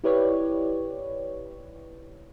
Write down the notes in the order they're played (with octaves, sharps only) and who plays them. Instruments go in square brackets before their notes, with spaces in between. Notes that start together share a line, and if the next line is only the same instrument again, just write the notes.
[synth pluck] E4 G4 B4 C#5 D5